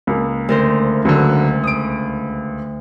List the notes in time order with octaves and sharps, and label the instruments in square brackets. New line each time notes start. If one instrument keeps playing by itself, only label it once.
[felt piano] C#2 A#3
[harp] D2 A#4 C5
[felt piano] C#2 [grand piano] D3 F#3
[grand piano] D#6 D7